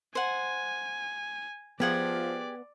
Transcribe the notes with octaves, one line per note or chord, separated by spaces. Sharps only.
C5 F#5 G#5
F3 B3 G4 G#4 D5 F#5